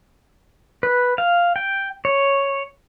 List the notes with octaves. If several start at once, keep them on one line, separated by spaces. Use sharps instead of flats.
B4
F5
G5
C#5